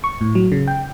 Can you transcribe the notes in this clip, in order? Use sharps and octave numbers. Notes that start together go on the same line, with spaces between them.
C#6
A2
F#3
C#3
G5